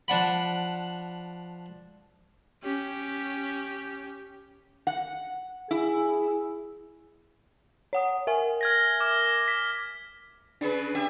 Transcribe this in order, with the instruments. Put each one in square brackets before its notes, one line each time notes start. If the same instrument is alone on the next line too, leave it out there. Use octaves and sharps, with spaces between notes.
[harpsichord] F3 D4 F#5 B5
[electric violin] C#4 G4
[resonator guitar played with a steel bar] F#5
[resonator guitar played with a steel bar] E4 [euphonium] G#4
[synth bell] C#5 F#5 D#6
A#4 E5 G#5
[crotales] F6 G#6 A#6
D6 F6
B6
[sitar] C#3 G#4 B4 [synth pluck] D4
[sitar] C#4 G4 E5